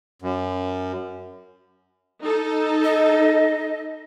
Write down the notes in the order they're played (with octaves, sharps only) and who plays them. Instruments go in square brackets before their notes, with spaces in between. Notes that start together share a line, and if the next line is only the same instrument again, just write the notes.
[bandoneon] F#2
[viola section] D#4 A4
[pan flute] D#5